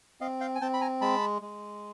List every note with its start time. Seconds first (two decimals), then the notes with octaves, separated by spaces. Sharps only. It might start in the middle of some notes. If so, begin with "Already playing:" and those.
0.21 C4 D#5 F5
0.40 F5 G5
0.55 G#5
0.61 C4 G5 A5
0.73 B5
0.81 G#5 A#5
1.01 G#3 A5 B5
1.42 G#3